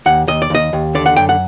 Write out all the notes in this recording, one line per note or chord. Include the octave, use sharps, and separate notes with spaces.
D#2 F#5
D#2 D#5
D5
D#2 D#5
D#2
D3 D5
F#5
F#2 G5
F#5